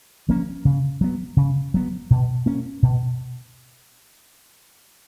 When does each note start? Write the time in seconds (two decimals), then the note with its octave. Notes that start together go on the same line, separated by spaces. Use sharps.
0.28 F3 A#3 C#4
0.65 C#3
1.01 F#3 B3
1.37 C#3
1.74 F#3 B3
2.10 B2
2.46 A#3 C#4
2.83 B2